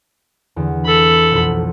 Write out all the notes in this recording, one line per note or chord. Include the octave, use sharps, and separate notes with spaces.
E2 D3
A4 B5
B1 F2